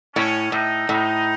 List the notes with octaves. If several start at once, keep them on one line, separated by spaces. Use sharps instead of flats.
A2 C#4
A2 D#4
A2 D#4